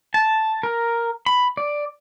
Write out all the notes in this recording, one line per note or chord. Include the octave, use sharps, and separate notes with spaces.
A5
A#4
B5
D5